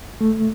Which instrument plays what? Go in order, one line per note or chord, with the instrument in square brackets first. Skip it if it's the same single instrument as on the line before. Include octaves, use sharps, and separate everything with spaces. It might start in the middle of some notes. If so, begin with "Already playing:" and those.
[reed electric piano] A3